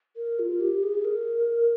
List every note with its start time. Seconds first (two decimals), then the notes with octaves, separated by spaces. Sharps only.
0.16 A#4
0.39 F4
0.60 G4
0.83 G#4
1.04 A#4